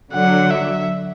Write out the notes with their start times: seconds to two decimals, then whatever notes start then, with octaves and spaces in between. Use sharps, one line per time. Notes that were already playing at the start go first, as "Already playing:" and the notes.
0.13 D3 F#3 F#5
0.50 E5